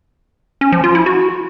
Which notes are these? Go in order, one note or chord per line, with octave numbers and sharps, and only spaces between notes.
C#4
F3
F4
E4
F#4